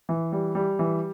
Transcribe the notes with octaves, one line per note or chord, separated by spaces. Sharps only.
E3
G3
G3
E3